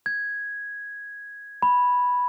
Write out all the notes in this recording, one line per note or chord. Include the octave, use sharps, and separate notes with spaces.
G#6
B5